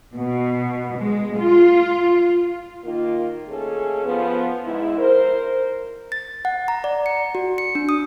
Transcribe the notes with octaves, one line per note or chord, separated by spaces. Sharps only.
B2
G#3
F4
D#3 A#3 F4
D#2 A3 C#4 G#4 A4
F3 B3
G#2 E4
A#4 C5
A6
F#5
A#5
D5
C#7
F#4
C#7
D4
D#6